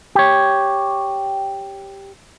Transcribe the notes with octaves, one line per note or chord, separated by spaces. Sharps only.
G4 C#5